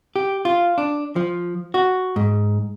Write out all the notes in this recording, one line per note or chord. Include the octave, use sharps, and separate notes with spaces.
G4
F4
D4
F3
F#4
G#2